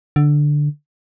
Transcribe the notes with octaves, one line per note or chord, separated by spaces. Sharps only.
D3